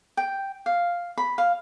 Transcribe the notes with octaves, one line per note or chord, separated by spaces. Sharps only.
G5
F5
B5
F5